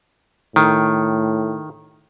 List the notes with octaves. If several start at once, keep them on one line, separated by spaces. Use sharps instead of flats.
A2 D#3